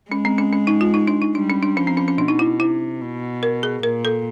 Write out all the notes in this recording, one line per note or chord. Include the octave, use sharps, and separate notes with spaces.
G#3 C#4
C4
C#4
C#4
D#4
F4
D#4
D4
D#4
G3 D4
C#4
D4
F3 C#4
C4
C#4
C#4
B2 D4
D#4
E4
C3 E4
B2
A#4
G#4
A#2 A#4
A4